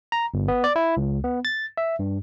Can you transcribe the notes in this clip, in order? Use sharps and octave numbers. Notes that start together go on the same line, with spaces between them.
A#5
G1
B3
D5
E4
C#2
B3
A6
E5
G2